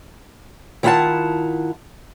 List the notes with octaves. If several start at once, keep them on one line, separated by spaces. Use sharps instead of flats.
D#3 E4 F4 C#5 F#5 A5